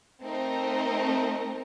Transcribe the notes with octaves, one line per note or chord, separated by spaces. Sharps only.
A3 C4 D#4 A#4